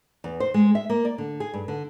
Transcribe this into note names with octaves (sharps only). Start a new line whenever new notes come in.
E2
C5
G#3
E5
A#3
D5
D3
G#4
G2
D3